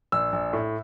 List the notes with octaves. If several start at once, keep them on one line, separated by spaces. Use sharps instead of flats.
A#1 E6
A#1
A2